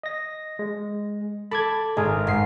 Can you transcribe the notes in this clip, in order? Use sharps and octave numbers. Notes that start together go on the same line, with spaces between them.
D#5 A#6
G#3
A4 B5 D6 G#6
G#1 G#3 G#4 A#4
G#2 C7